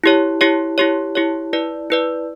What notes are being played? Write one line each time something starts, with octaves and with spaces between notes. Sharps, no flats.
E4 G4 C#5
E4 G4 C#5
E4 G4 C#5
E4 G4 C#5
E4 B4 D5
E4 B4 D5